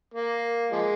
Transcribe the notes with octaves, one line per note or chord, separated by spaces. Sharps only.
A#3
F3 G#3